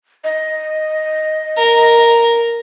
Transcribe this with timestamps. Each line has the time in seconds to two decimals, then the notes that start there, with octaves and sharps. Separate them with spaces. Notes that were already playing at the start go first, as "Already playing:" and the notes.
0.24 D#5
1.57 A#4